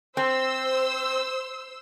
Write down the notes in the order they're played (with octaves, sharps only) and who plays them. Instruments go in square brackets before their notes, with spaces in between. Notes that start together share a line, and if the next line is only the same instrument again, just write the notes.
[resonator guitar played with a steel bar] C4 [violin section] C5 E6